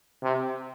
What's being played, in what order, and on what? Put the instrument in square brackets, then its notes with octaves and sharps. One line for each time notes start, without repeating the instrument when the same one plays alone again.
[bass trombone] C3